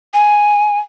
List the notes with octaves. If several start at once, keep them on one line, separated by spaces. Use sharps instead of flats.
G#5